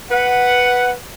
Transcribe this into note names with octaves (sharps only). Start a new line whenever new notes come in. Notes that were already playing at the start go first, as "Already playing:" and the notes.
B4 F#5